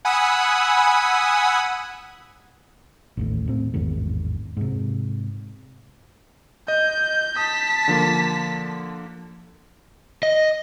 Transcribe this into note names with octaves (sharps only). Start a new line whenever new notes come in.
F#5 G#5 B5 D#6 E6
A1 D#2 A2
A2 C4
A1 E2 G#2 D#3
G#2 C3
D#5 G6
A5 D#6 B6
D3 F3 A#3
D#5